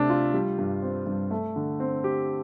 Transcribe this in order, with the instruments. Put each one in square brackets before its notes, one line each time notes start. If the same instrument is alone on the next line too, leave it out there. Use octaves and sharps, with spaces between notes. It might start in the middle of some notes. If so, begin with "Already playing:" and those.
Already playing: [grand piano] C3 A3 D4
F4
G3
G2
C4
G2
A3
D3
C4
G4